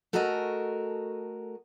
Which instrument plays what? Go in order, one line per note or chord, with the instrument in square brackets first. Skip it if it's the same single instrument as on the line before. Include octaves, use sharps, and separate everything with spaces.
[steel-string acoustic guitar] A3 F#4 A4 A#4 D#5 G#5